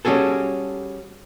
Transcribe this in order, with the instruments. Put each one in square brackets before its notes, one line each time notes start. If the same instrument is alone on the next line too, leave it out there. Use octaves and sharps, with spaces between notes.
[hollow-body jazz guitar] G3 C#4 F#4 G#4 A4